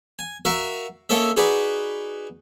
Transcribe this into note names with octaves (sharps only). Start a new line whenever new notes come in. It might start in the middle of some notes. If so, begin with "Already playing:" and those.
G#5
F#4 A#4 E5 F5
A#3 C#4 A4 D#5 E5
D#4 F#4 G#4 B4 D5